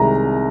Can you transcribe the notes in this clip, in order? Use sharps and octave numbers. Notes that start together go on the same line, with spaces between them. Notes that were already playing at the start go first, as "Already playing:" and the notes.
Already playing: C2 C3 D#3 G#3 A#5